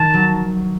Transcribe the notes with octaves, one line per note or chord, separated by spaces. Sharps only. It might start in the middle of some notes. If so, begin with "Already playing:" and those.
Already playing: D#3 A5
F#3